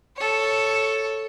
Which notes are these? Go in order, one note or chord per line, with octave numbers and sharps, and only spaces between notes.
A4 C#5